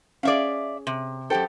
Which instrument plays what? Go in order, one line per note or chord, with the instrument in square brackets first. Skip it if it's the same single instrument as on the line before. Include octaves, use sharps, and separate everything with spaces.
[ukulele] C#4 G#4 [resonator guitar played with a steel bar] D5 E5 F5
[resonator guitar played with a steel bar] C3
[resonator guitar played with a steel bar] F#2 G4 A4 [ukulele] C5 G5